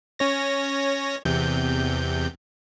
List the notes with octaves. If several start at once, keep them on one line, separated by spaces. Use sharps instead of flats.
C#4 C#5 A#6
E2 C3 G6